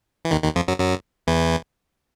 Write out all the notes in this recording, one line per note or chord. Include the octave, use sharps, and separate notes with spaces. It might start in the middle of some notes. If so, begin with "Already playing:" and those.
E3
D#2 D#3
D#2 D#3
F2 F3
F#2 F#3
F#2 F#3
E2 E3